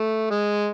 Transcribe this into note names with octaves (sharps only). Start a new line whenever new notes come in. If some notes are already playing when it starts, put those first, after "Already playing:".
Already playing: A3
G#3